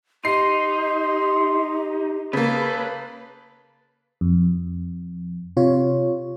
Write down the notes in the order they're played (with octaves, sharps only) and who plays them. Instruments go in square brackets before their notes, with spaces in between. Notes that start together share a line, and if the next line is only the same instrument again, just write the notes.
[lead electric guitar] D#4 [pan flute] G4 [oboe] C6 [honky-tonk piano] C7
[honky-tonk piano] C#3 A#3 [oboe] A4 [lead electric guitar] B4
[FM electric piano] F2
C3 F4 C#5